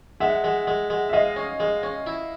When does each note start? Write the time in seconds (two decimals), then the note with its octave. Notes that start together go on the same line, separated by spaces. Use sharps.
0.20 G#3 E5 F#5
0.44 G#3
0.67 G#3
0.90 G#3
1.09 E5
1.13 G#3 D#5 F5
1.36 C#4
1.60 G#3
1.83 C#4
2.06 E4